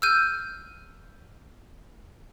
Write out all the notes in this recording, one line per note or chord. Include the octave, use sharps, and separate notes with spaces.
E6 F6 G6 D#7